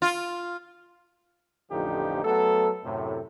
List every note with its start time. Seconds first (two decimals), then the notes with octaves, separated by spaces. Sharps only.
0.02 F4
1.71 A1 F2 D3 F3 D#4 G4
2.24 F#3 A3 B3 A4
2.84 F#2 A2 C3